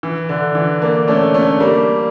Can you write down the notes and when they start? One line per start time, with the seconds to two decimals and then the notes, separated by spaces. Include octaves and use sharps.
0.03 E3
0.29 D3
0.55 E3
0.82 A#3 D4
1.08 A3 C#4
1.34 A3 C#4
1.60 G3 A#3